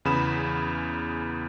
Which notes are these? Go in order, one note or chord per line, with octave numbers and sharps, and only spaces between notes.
E2 C#3 B3 B5 E7